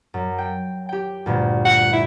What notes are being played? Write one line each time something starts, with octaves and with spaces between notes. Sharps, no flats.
F#2
G5
G4 G5
D2 G2 A#2
F#5
E4